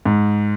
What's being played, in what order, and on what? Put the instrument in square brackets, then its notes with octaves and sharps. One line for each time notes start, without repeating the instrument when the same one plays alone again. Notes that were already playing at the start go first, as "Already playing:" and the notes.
[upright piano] G#2